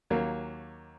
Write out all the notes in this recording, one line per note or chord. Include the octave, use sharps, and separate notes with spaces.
D#2 F#3 A#3